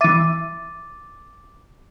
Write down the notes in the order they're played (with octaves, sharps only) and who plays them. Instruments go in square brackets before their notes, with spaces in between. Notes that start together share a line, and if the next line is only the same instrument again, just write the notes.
[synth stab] E3 E5 [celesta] D6 A6 D#7